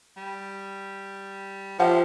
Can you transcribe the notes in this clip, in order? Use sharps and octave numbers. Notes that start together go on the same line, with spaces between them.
G3
F3 G4 C#5 E5 F#5 G5 A5